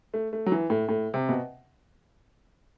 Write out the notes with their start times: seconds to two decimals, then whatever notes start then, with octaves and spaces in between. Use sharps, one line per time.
0.14 A3
0.33 A3
0.46 F#3
0.52 E3
0.70 A2
0.88 A2
1.14 C3
1.29 B2